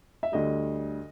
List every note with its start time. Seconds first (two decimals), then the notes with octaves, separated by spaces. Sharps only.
0.23 E5
0.32 D2 D3 G3 D#5